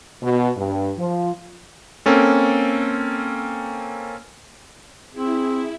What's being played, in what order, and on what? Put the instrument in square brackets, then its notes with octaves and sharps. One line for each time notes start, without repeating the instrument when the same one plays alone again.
[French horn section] B2
G2
F3
[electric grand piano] A#3 C4 C#4 A4
[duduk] C4 [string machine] E4 [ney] G#4